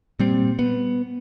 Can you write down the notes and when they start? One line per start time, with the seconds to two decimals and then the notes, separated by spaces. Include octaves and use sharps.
0.19 A#2 G3 C4
0.59 B3